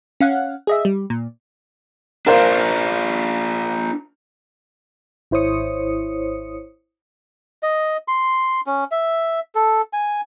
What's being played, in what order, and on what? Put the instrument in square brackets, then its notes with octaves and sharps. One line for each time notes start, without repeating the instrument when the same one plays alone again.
[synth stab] C#4 F5 F#5
G#4 D#5 E5
G3
A#2
[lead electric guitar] D4 F4 [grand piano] A#4 C5 F5
[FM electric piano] G#1 E4 C5 C#5 D#6 C#7
[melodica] D#5
C6
C#4
E5
A4
G#5